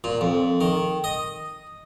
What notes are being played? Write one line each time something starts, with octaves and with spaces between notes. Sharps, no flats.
A#2
F2
D#3
D#5